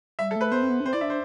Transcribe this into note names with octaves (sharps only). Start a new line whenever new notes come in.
G3 E5
A4
A3 B4
B3 C5
C4
B3
D4
C4 C5
E4 D5
D4 E5
C5